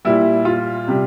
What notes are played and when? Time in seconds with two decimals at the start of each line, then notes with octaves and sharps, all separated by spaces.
0.05 A#2 G3 E4
0.45 F4
0.88 C3 G3